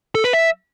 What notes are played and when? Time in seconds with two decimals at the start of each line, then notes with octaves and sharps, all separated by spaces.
0.15 A4
0.24 B4
0.33 E5